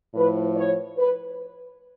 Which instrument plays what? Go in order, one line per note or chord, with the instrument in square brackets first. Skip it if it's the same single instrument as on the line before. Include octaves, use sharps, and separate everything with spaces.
[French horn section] A2 F3 B4
C#5
B4